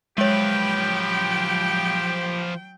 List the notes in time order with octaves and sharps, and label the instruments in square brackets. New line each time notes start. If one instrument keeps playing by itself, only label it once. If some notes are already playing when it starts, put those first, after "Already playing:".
[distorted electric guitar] F3 B4 [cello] F#3 G5 [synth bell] G#3 C#5 [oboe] G4